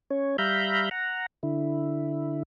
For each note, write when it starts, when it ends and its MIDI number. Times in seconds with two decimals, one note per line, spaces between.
0.10 0.37 61
0.10 0.37 73
0.38 0.89 55
0.38 0.89 76
0.38 0.89 77
0.38 0.89 82
0.38 0.89 83
0.38 0.89 91
0.91 1.26 78
0.91 1.26 82
1.43 2.43 50
1.43 2.43 64